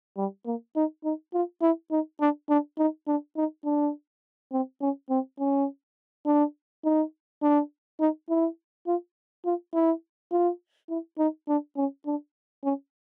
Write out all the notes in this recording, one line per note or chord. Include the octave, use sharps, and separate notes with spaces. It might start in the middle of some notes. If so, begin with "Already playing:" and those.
G3
A#3
D#4
D#4
F4
E4
D#4
D4
D4
D#4
D4
D#4
D4
C4
C#4
C4
C#4
D4
D#4
D4
D#4
E4
F4
F4
E4
F4
E4
D#4
D4
C#4
D4
C#4